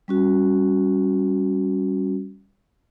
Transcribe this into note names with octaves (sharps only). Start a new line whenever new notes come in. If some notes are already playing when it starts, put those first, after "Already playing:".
G3 C#4 F#4